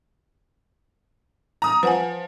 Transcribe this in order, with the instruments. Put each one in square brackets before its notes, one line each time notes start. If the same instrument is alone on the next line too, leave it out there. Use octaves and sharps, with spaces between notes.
[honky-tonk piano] A#5 D#6
[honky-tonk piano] F3 [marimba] B4 F#5 G#5